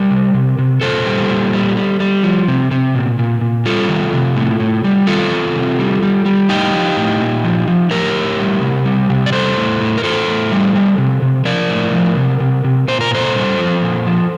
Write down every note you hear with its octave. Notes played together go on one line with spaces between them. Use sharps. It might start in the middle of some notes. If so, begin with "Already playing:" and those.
Already playing: G3 A#4
C3
C3
C3
A#2 A4 C5
G3
A#2
G3
G3
G3
F3
C3
C3
A#2
A#2
A#2
G3 F4 A4
D#3
C3
A2
A2
G3
D#3 F4 A4
D#3
C3
G3
G3
G3
A2 D#4 G4
F3
A2
A#2
F3
F3
A2 G4 A#4
A2
G3
C3
G3
C3
D5
G3 A4 C5
A2
A2
A#4
A2 A4 C5
A2
G3
G3
C3
C3
F3 A#4 D5
A2
F3
C3
C3
C3
A#2 C5
A#4
A#2 A4 C5
G3
F3
A#2
F3